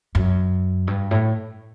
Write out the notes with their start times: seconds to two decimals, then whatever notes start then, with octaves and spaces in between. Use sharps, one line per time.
0.15 F#2
0.87 G2
1.11 A2